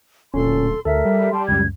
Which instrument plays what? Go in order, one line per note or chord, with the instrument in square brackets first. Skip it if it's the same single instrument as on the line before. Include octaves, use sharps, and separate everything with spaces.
[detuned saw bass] D1 [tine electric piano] A#2 C#4 [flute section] A4 C6
[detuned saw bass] D2 [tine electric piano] A4 [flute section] A#4 E5
[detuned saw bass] G3
[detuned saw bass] G3 [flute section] G5 A5 C6
[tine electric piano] C#2 F#2 [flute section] G#6